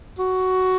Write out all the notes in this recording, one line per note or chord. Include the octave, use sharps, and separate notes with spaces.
F#4